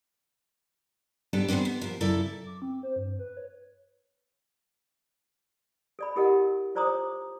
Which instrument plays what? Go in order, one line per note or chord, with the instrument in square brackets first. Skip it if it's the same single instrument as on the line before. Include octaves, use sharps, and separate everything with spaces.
[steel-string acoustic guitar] G#2 G3 B3 D4 A4
D#3 G#3 B3 C4 D4
B3
F3 A#4
F#2 C#3 E4 A4 D5
[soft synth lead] D6
C4
C5
G2
B4
C#5
[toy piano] A4 D5 B5
E4 G4 A4 A#4 D#5 F#5
F4 C5 D5 A#5 D6 D#6
C#5